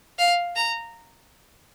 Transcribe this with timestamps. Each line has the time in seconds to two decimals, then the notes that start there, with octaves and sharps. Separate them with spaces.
0.19 F5
0.56 A#5